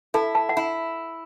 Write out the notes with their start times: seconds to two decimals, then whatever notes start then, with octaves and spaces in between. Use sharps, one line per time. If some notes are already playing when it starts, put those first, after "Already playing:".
0.14 E4 A4 A5
0.35 A5
0.49 F#5
0.57 E4